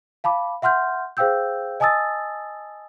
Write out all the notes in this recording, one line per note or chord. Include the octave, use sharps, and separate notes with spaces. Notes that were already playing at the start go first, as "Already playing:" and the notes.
F5 A5 B5 D6
E5 F#5 C6 F6 G6
G#4 C5 F5 G5 E6 G6
D#5 G#5 A5 D#6 E6 A6